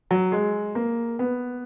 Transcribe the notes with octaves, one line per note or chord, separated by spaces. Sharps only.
F#3
G#3
A#3
B3